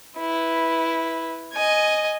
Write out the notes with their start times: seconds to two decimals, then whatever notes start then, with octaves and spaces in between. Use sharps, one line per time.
0.17 E4 B4
1.53 D#5 G#5